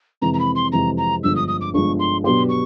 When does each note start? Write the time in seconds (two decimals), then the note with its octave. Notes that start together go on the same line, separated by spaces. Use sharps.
0.21 F2 C3 E3 G#3 A#5
0.34 A#5
0.39 B5
0.55 C6
0.72 F2 C3 E3 G#3 A#5
0.97 A#5
1.23 G1 G2 D3 F3 G#3 E6
1.36 D#6
1.48 D#6
1.61 D6
1.74 G1 G2 D3 F3 G#3 C#6
1.99 C6
2.24 B2 F#3 B3 D4 G4 C6
2.49 C#6